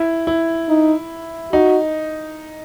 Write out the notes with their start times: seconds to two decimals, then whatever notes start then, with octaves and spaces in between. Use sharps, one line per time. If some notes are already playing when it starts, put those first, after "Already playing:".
Already playing: E4
0.27 E4
0.68 D#4
1.52 D#4 F#4